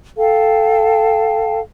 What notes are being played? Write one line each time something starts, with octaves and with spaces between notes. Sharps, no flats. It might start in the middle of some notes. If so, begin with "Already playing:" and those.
A4 F5 G5 A5